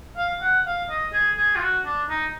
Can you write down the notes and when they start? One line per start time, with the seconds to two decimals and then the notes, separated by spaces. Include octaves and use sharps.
0.17 F5
0.41 F#5
0.66 F5
0.90 D#5
1.13 G#4
1.37 G#4
1.56 F4
1.61 F#4
1.85 D4
2.09 D#4